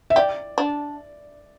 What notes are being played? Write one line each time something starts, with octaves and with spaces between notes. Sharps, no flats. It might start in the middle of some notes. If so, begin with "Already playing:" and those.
E5
G4 D5
D4